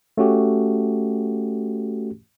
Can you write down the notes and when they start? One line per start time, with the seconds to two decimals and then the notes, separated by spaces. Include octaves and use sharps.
0.18 A3 C#4 F#4 G4